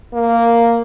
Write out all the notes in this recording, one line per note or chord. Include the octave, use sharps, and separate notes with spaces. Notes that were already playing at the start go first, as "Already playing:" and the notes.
A#3